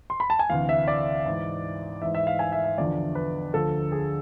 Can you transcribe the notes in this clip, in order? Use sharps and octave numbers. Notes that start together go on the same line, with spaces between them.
C6
B5
A5
G#5
D2 C3 E3 F5
E5
D5
G#2 E3
G#2 E3 E5
E5
F5
G#5
E5
E5
E2 D3 F3 D5
B4
D2 D3 F3 A4
G#4